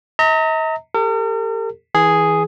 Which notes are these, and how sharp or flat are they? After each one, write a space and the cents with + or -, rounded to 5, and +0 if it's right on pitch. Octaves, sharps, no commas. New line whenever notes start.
D#5 +45 A#5 -30
G4 +35 A#4 -45
E3 -25 G#4 +0